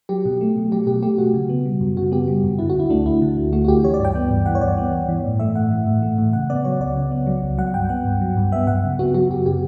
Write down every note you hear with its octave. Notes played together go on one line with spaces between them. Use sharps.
F#3 G4
B2
A3
B2
F#3 G4
B2 G4
A3 G4
B2 F#4
C#3
B3
G3
F#2
C#3 F#4
B3 G4
G3
F#2
D3 E4
F#4
D2 E4
A3 D4
D2 E4
D3
D2
A3 F#4
F#4
D2 G4
E3 C#5
D5
G2 G5
B3
G2
E3 F#5
C#5
G2 D5
B3
G2
E3
A2
A3 E5
A2 F#5
E3
A2
A3
A2
C#3 F#5
B3 D5
F#3 C#5
C#2 D5
C#3
B3
F#3
C#2
F#3 F#5
G2 G5
B3 F#5
G2
F#3
G2
B3 E5
G2 F#5
C#3
B3 F#4
F#3 F#4
F#2 G4
C#3 G4